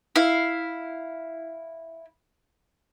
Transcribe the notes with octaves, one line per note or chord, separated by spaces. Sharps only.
E4 F5